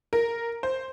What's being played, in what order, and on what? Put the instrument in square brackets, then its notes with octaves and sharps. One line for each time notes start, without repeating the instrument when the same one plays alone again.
[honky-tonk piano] A#4
C5